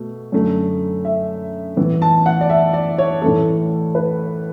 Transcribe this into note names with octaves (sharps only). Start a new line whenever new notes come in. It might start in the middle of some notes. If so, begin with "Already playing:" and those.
Already playing: B2 A3
F#2 D3 A3
E5
A2 E3 B3
A5
F#5
D5
E5
D5
C#5
A2 E3 A3 A4
B4